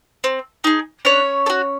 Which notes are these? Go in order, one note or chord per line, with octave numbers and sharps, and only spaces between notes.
C4
D#4 G#4
C#4 D4 C#5
A4
F#4